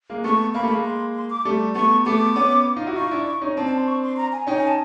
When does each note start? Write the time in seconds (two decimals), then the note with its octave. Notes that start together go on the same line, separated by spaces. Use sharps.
0.09 G#3 A#3
0.24 A3 B3 C#6
0.54 A#3 B5
0.63 A3
0.70 G#3 A#3
0.85 C6
1.15 C6
1.30 D6
1.45 G3 A3
1.75 A3 B3 C#6
2.06 A3 B3 D6
2.36 B3 C#4
2.76 D#4 F4
2.86 E4 F#4
2.96 D#4 F4 C#6
3.11 D4 E4
3.42 C#4 D#4
3.57 C4 D4 A5
3.67 A5
3.77 C6
3.88 C#6
4.03 C6
4.17 A#5
4.32 G#5
4.47 C#4 D#4 G5
4.57 G#5
4.67 A5